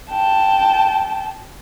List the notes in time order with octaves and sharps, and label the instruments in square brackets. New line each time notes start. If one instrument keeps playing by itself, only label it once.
[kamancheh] G5 A5